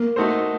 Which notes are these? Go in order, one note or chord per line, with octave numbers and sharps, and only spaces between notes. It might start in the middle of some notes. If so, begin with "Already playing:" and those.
Already playing: A#3
A3 D#4 F#4 A4 C5